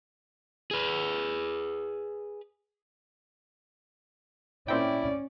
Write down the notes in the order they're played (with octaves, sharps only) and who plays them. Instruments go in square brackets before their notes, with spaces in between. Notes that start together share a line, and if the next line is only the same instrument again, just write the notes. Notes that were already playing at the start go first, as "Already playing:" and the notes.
[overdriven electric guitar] G#4 B4
[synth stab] A#2 C4 G5 [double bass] C#4 [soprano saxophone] E4 [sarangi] D5